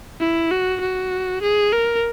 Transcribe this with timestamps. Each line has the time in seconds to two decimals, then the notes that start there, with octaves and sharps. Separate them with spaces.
0.20 E4
0.51 F#4
0.81 F#4
1.42 G#4
1.72 A#4